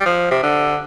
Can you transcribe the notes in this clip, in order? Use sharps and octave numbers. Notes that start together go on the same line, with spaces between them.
G3
F3
C3
D3